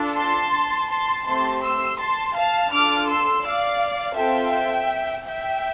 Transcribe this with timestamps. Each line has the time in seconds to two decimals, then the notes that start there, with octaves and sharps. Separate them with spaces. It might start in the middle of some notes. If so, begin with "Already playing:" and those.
Already playing: D4 F4 A4
0.16 A5 C6
0.89 A5 C6
1.26 A3 C4 G4 A5 C6
1.62 C6 E6
1.98 A5 C6
2.35 F5 A5
2.71 D4 F4 A4 D6 F6
3.07 C6 E6
3.44 D5 F5
4.16 C4 F4 A4 E5 G5
5.26 E5 G5